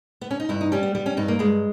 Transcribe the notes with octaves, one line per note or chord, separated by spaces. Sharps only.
B3
C#4
D#4
G2 E4
D#4
G3 C#4
B3
G3 B3
C#4
G2 D#4
A#3
G2 G#3